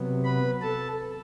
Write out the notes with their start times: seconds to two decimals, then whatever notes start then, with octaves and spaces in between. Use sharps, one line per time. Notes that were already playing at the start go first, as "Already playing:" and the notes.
Already playing: C3 F#3 B3
0.24 B4 B5
0.62 A4 A5